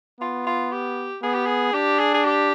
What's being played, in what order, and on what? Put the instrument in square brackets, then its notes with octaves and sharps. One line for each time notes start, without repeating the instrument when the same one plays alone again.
[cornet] B3 [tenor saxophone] F4
[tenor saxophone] F4
G4
[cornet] B3 [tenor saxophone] G#4
[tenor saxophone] G4
G#4
[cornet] D4 [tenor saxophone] G4
[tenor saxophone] G#4
G#4
G4